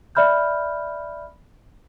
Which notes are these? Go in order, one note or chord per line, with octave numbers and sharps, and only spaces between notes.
D5 E5 B5 F6 G6